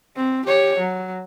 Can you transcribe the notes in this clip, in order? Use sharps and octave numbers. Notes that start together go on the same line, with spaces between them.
C4
G4 C#5
F#3